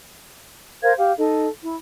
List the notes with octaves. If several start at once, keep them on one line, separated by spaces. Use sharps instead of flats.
A#4 C5 F5 G#6
G4 F5
D#4 A4
E4